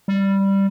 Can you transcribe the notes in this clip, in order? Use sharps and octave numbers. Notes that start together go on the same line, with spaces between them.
G3